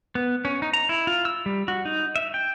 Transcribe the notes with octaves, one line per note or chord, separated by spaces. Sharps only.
B3
C#4
D#4
A#5
E4
F4
E6
G3
F#4
D#4
E5
G5